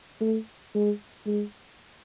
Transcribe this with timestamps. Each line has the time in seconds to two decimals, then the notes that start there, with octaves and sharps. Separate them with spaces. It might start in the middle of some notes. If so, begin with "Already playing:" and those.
0.21 A3
0.75 G#3
1.27 G#3